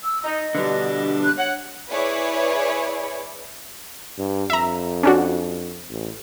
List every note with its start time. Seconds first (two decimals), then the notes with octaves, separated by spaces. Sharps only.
0.04 E6
0.24 D#4 D#5
0.55 B2 D3 E3 G3 D4
1.24 F#6
1.37 C#5 F#5
1.90 E4 G#4 B4 C#5 D5
4.18 G2
4.50 F2 E5 A#5
5.03 C#4 D4 F#4
5.90 A1